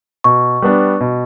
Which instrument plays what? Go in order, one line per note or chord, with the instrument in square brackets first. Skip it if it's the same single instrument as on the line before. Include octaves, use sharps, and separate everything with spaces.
[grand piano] B2 [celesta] C#6
[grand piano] G3 B3 D4
B2